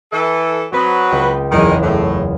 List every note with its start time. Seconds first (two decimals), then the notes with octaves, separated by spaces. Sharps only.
0.12 E3 A4
0.72 F#3 C4 B4 C6 D#6
1.10 C#2 G5 A#6
1.51 F#1 E2 D#3 G#3
1.82 A2 E7